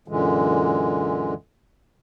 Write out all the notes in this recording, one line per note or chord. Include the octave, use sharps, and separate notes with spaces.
F#2 A#2 D3 E3 G#3